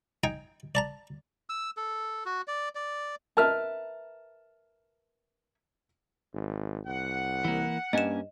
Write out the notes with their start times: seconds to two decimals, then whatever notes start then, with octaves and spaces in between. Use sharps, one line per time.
0.24 D#4 G5 G#5
0.75 D5 A5 A#5
1.50 E6
1.77 A4
2.25 F#4
2.48 D5
2.75 D5
3.37 A#4 B4 E5 A5 F6
6.33 G#1
6.87 C2 F#5
7.44 E3 A#3
7.93 G2 A#3 C#4 D#5 G#5 E7